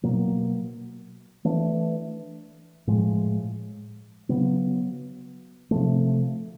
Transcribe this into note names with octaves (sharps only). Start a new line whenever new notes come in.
B2 F#3 A#3
E3 A3 D4
A2 F3 G#3
C#3 F#3 B3
C3 F3 A3